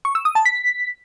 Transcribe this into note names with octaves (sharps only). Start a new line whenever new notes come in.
C#6
E6
D#6
A5
B6